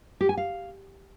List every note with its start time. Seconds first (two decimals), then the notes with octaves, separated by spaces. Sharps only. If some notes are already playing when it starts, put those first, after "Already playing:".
0.21 G4
0.29 G#5
0.37 F5